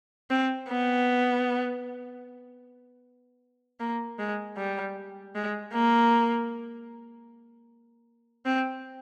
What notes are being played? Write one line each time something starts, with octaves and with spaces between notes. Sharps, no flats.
C4
B3
A#3
G#3
G3
G#3
A#3
C4